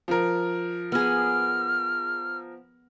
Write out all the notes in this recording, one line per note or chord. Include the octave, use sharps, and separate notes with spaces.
F3 A#4
B3 G#4 F6